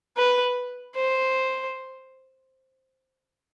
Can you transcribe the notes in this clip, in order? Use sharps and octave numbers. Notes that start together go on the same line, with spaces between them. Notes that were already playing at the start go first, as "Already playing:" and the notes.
B4
C5